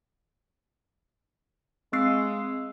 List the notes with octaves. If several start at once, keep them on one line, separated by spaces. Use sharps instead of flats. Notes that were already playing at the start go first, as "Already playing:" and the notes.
G#3 C4 E6 C7